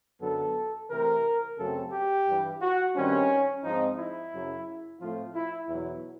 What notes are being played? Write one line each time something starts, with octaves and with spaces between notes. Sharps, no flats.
F#2 D3 F#3 B3 A4
C3 E3 A3 C4 A#4
F#2 C#3 F#3 A3 C4 A4
G4
G2 E3 G3
F#4
G2 D#3 G3 C4 C#4
G#2 F3 G#3 C4 D#4
E4
F#2 C#3 F#3
A2 F3 A3 C4 F4
E4
E2 B2 F#3 E4